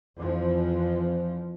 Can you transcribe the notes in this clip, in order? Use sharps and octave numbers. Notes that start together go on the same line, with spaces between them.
F2 E3 F3